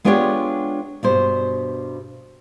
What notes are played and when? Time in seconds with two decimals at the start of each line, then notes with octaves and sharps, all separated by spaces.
0.05 G#3 B3 D4 F4 G4 C#5
1.03 G2 B2 C5